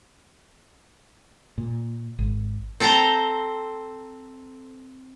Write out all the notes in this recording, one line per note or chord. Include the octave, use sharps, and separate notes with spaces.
A#2
G#1
C4 A4 C5 G5 A#5